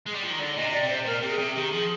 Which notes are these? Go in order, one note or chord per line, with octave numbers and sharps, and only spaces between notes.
G#3
G3
F3
D#3
D3 D5
A#2 D#5
C3
D5
C3
C5
A#2 A#4
C3 G4
G#4
C3
G4
D#3
F3 G#4